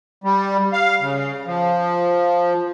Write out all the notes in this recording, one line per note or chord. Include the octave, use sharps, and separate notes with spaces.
G3
F5
C#3
F3